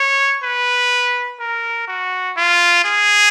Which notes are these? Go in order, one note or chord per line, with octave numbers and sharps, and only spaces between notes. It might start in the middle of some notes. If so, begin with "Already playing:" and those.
Already playing: C#5
B4
A#4
F#4
F4
G#4